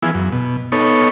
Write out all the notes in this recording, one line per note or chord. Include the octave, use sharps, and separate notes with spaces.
E3 F3 B3 E4 G#4
F#2
B2
B3 D#4 A4 C#5